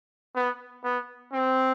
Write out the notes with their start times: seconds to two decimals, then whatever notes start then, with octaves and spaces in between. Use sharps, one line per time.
0.35 B3
0.84 B3
1.32 C4